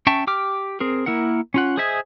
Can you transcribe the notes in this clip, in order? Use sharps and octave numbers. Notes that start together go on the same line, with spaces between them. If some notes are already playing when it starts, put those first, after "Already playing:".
C#4 E5 G5 A5 C#6
G4 G5 D6 F6
C4 G#4 A#4
A#3 E4 A#4 F#5
C#4 F4 F#5
G#4 C5 D#5 E5 G#5